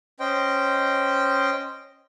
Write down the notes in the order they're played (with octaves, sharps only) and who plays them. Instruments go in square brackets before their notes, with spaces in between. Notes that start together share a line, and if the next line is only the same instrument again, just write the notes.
[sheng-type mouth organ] C#4 C5 D#5 G5